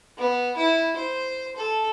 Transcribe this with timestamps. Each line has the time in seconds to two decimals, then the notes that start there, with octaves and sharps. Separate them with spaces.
0.18 B3
0.57 E4
0.96 C5
1.56 A4